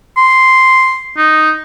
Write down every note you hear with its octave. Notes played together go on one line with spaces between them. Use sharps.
C6
D#4